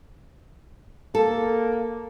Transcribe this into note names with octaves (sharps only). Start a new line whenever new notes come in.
A#3 A4